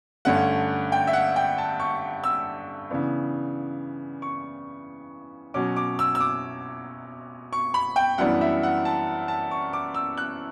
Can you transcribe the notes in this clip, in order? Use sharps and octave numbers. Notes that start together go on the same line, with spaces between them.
G2 D3 A3 C#4 F#5
G5
E5
F#5
G5
A5
C#6
E6
C#3 E3 B3 D4
C#6
B2 F#3 C#4 D6
D6
E6
E6
D6
C#6
B5
G5
F#2 E3 G3 B3 D4 F#5
E5
F#5
A5
A5
C#6
D6
E6
F#6